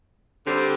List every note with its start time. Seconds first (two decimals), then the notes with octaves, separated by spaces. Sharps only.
0.46 D3 G3 C4 G4 C5